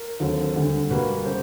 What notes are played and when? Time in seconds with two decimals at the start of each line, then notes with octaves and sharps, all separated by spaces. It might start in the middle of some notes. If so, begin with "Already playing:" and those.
Already playing: A#4
0.20 D#2 D3 F#3 A3 C4
0.55 D2 D3 G3
0.90 B2 G3 A#3 B4
1.26 C#3 C5